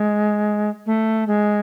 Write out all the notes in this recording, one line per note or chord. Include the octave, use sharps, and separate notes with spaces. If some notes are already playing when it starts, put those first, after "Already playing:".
Already playing: G#3
A3
G#3